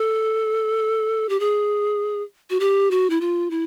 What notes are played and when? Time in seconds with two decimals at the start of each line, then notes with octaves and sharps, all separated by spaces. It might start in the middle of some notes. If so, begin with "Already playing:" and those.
Already playing: A4
1.29 G4
1.40 G#4
2.50 F#4
2.60 G4
2.91 F#4
3.10 E4
3.21 F4
3.51 E4